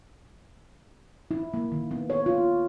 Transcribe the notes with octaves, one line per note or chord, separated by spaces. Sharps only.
E4
A#3
D#3
B3
C#5
F4